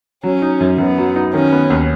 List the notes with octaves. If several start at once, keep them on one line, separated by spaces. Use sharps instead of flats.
F#3 C#4
D#4
F#2
F#2 B3
F#3
D#4
D#3 C#4
B3
D#2